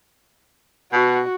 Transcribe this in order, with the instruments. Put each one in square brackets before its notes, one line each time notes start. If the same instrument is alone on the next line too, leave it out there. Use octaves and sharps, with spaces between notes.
[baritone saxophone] B2 [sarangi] F#4